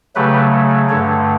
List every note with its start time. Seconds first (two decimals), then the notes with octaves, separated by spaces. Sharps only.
0.15 C#3 F#3 A3 G4 B4
0.89 G2 D3 A3 A4 C#5